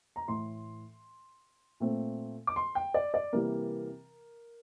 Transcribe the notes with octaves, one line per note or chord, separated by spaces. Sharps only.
A#5
A2 E3 A3 C6
A#2 A3 C4
D6
C6
G5
D5
D5
C3 E3 G3 A#3 A#4